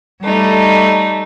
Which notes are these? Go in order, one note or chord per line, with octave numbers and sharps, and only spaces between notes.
G3 A3 D#4